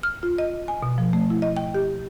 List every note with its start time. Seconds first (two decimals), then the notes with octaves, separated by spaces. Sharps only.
0.03 F6
0.23 F4
0.38 D#5
0.68 G#5
0.83 B2
0.98 F3
1.13 A3
1.30 E4
1.42 D#5
1.57 G5
1.74 G4